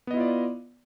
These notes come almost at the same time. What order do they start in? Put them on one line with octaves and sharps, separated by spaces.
B3 D#5 E4 F4 D5